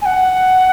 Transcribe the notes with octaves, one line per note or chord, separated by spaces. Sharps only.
G#5
F#5